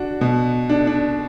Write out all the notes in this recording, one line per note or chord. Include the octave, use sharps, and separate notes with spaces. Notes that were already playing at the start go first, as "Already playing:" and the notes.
Already playing: D4 F#4
B2
D4
D4